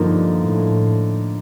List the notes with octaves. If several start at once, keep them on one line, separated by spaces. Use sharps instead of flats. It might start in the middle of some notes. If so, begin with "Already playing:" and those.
Already playing: G2 D3 F3 A#3 D#4
A2